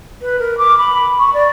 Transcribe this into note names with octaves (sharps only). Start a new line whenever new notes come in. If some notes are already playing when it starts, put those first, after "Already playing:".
B4
A#4
D6
B5
C#6
D5